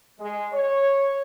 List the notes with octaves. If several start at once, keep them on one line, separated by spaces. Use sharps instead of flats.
G#3
C#5